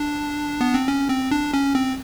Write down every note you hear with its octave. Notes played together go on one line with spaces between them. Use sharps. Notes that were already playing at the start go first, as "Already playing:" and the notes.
Already playing: D4
B3
C4
C#4
C4
D4
C#4
C4